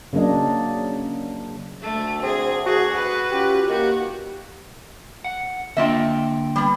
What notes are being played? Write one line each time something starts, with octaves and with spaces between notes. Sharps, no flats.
C#3 F#3 A#3 D4 D#5
D2 A3
C4 G#4
F#4 G#4
B4
C#4 F4 G4
D#3 A#3 F#4 G4
F#5
D3 A#3 F4 D#5 E5 G5
G3 B3